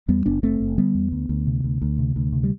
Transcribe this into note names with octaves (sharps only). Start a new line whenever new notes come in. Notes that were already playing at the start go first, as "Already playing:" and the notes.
E2 G3 B3
F#1 B3 D4
F#1 A3 C4
F#1
D3 G3 B3
E2
D2
D2
C3
D2
D2
C3
D2
C3
G3